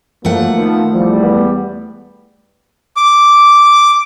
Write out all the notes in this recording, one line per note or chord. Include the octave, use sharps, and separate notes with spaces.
G2 F3 F#3 A3 A#3 F#5
D#3 F3 B3
E2 F3 G3
B3
D6